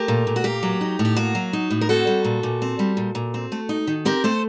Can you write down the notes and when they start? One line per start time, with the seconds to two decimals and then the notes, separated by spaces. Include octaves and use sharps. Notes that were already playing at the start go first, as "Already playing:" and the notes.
Already playing: A3 G4 A#4
0.08 A#2
0.27 A#2
0.36 F#4
0.44 A#3 G4
0.63 F#3
0.81 D#4
0.99 A2
1.05 G4
1.16 A#3 F#4
1.35 F#3
1.53 D#4
1.70 A2
1.81 A#4
1.89 C4 F#4 A4
2.07 G3
2.25 A#2
2.43 A#2
2.62 C4
2.79 G3
2.97 A#2
3.15 A#2
3.34 C4
3.52 A3
3.69 D#4
3.87 D#3
4.05 C4 G4 A#4
4.24 A3 A4 C5